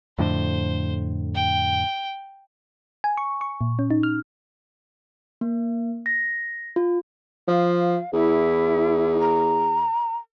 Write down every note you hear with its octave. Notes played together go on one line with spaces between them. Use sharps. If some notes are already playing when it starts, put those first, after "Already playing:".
F2 A2 D3 C5
G5
G#5
C#6
C#6
A#2
C#4
D#4
F6
A#3
A#6
F4
F3 F5
E2 E4
A#5